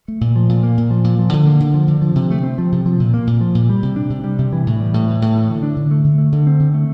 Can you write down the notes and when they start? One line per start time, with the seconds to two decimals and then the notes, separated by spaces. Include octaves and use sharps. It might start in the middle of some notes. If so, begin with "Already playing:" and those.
0.08 A3
0.21 A#2
0.36 F3
0.49 A#2
0.63 A#3
0.78 A#2
0.91 F3
1.04 A#2
1.19 F3
1.33 D3
1.46 A#3
1.60 D3
1.74 F3
1.88 D3
2.02 F3
2.15 C3
2.31 A3
2.43 C4
2.58 F3
2.72 C3
2.86 F3
3.00 A#2
3.14 A#3
3.27 A#2
3.41 F3
3.55 A#2
3.69 G3
3.83 C3
3.96 D4
4.10 C3
4.24 G3
4.39 C3
4.53 E3
4.67 A2
4.80 G3
4.94 A2
5.08 E3
5.22 A2
5.36 A3
5.49 D3
5.63 D4
5.76 D3
5.91 A3
6.04 D3
6.18 A3
6.32 D3
6.47 C4
6.60 D3
6.74 A3